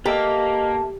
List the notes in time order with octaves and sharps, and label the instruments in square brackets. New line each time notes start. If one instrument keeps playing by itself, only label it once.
[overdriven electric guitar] A#3 [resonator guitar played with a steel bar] G4 [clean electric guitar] A4 E5 [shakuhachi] D#5